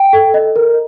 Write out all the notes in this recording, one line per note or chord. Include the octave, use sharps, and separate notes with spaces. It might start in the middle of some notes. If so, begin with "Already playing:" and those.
Already playing: G5
A4
D#5
A#4